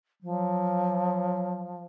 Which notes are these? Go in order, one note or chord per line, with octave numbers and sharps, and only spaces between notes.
F3 F#3